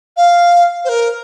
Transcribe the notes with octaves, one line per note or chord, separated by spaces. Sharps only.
F5
C5
A#4